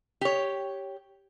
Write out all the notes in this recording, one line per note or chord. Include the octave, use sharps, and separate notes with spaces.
G4 C#5